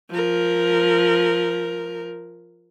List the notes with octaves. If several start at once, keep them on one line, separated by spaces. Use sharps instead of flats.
F3 A#4